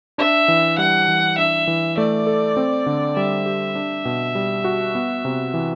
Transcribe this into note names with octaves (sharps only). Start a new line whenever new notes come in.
D4 E5
E3
G3 F#5
E3
D4 E5
E3
A3 D5
A4
C4
D3
G3 E5
G4
D4
B2
G3
F#4
B3
C3
E3